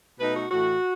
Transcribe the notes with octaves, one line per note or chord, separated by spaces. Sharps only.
B2 A3 D#4 B4
F#4
A2 E3 A3 F#4